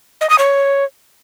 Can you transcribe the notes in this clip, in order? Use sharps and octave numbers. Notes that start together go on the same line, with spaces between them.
D#5
D#6
C#5